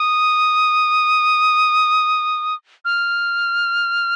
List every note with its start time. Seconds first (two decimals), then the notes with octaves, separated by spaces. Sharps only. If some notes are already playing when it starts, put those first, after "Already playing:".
Already playing: D#6
2.85 F6